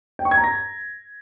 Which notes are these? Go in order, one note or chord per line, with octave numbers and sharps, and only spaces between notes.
G5
C#6
G#6
A#5
A#6